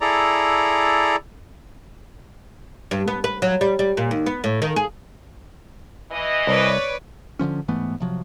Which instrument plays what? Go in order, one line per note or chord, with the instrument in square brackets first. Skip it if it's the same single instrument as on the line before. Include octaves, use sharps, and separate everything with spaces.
[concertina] E4 G#4 A4 D5 A#5
[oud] G2
B3
B4
F#3
G3
G3
A#2
D#2
B3
A2
D#3
G#4
[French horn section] E3 D#5
[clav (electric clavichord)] C2 [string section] B4 C#5 D5
[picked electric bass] D3 E3 F3 C#4
G#2 E3 A3 B3
C3 F3 F#3